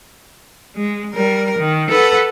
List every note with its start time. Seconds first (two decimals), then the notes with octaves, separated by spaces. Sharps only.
0.75 G#3
1.13 G3 A#4
1.58 D#3
1.91 A4 B4 F#5